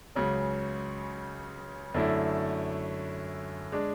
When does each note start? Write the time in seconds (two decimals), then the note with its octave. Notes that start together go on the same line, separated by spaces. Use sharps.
0.15 C#2 C#3 F#3
1.94 F#2 D3 A3 E4
3.72 G#3 D4